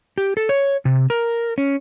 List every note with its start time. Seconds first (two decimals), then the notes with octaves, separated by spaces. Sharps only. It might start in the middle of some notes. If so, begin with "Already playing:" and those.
0.18 G4
0.37 A4
0.49 C#5
0.85 C3
1.10 A#4
1.58 C#4